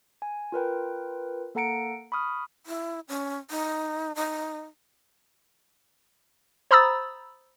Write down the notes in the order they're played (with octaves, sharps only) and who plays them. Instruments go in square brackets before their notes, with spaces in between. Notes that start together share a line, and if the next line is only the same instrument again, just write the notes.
[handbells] G#5
F4 A#4 B4 G5
A#3 A4 F#5 A#5 C#7 D7
B5 C#6 D#6 F6
[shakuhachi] E4
C#4
D#4
D#4
[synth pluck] C5 A#5 B5 D#6 E6 A6